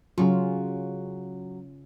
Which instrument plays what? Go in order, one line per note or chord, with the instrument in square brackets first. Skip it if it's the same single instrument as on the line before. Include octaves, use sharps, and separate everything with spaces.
[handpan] C#3 C#4 F4 [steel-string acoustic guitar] F#3